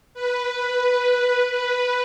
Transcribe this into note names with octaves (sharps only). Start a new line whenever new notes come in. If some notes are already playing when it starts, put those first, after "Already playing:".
B4
B4